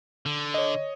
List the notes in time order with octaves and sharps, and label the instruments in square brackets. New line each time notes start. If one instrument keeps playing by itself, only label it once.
[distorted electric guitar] D3
[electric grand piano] C#5 D#5